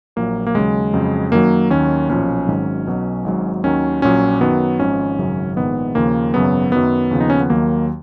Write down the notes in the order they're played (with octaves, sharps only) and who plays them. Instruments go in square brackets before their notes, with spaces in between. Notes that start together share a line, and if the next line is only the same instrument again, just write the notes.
[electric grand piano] A#1 A#2 F#3 A#3
A#3
D#2 C#3 F#3 G#3
F2 C#3 F#3
F#2 D#3 F#3 A#3
D#2 D#3 F#3 C#4
B1 A#2 F3 C#4
G#1 G#2 D#3 F#3
B1 B2 F#3
G#1 G#2 F#3
D#2 D#3 F#3 C#4
A#1 A#2 F#3 C#4
F#2 D#3 F#3 B3
G#1 G#2 F3 C#4
G#1 F#2 C#3 F#3
A#1 G#2 D#3 B3
D#2 C#3 F3 A#3
G#1 F#2 C#3 F#3 B3
F#2 D#3 F#3 B3
D#2 C#3 F3
D#4
C#4
B3
D#2 D#3 F#3 A#3